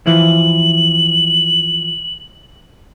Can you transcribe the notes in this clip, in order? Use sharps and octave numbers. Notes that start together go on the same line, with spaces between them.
E3 F3 E4 F#7